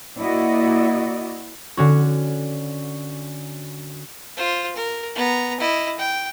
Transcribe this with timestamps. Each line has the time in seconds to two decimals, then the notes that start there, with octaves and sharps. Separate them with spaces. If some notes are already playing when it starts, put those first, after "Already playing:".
0.20 A#3 E4 F#4 D5 D#5
1.77 D3 C#4 F#4
4.37 F4 C5
4.76 A#4
5.15 B3 A#5
5.60 E4 D#5
5.98 G5